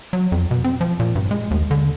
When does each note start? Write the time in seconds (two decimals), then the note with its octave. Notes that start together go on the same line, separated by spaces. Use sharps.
0.13 F#3
0.32 F2
0.51 B2
0.64 C4
0.81 F3
1.00 A#2
1.16 G2
1.31 G#3
1.51 D#2
1.71 D3